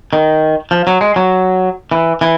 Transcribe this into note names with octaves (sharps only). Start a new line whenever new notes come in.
D#3
F3
F#3
G#3
F#3
E3
E3